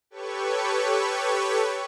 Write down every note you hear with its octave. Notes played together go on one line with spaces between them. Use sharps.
G4 A4 B4 C#5 C#6